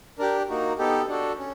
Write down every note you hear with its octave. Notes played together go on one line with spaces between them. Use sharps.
D4 G4 A#4
A#3 D#4 F#4
B3 D#4 G4 A4
D4 F#4 A4
C#4